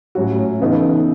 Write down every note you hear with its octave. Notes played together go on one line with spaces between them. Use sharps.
A2 F#3 C#4 F#4
C#3 E3 B3 D#4 A4